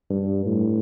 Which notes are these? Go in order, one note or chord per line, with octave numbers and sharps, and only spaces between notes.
G2
A2